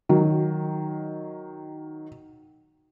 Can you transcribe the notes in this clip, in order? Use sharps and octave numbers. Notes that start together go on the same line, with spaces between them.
D#3 F#3